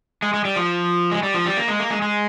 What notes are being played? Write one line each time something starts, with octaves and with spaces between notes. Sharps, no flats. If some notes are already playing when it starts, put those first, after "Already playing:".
G#3
G#3
G3
F3
G#3
G3
F3
G3
A#3
G#3
A#3
G#3
G#3